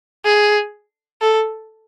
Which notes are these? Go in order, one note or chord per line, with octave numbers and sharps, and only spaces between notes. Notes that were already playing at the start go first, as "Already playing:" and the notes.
G#4
A4